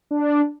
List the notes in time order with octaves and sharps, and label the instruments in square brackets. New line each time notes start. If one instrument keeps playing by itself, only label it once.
[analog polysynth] D4